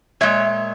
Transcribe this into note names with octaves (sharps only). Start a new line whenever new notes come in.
A#2 G#3 C#5 E5